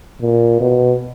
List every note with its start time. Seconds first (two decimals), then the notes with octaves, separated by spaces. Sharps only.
0.22 A#2
0.60 B2